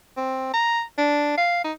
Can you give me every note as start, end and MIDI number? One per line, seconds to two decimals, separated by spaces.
0.17 0.51 60
0.54 0.81 82
0.98 1.33 62
1.37 1.62 77
1.64 1.72 63